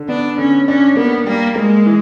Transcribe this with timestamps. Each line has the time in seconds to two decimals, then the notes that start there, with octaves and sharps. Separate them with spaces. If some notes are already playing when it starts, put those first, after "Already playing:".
Already playing: D3
0.08 B3 D4
0.38 D3 C#4
0.67 C#4 D4
0.97 A#3 B3
1.26 G3 A#3
1.56 G#3 A#3
1.86 E3